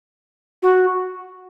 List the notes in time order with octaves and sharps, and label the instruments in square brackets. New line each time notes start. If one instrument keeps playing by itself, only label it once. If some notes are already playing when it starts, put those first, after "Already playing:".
[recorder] F#4